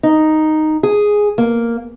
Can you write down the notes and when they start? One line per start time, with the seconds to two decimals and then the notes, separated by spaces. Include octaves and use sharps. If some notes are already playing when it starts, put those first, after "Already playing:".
0.03 D#4
0.83 G#4
1.38 A#3